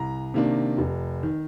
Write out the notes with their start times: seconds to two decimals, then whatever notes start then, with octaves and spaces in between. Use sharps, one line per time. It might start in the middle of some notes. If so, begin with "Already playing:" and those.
Already playing: C2 A#5
0.34 C3 D#3 A#3 D4
0.78 F1
1.23 D#3